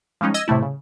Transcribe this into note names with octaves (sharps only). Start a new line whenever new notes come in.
F3 G3 G#3 C#4 D#4
D#5 E6 G#6 A#6
A2 C3 G3 A3 E4
C#3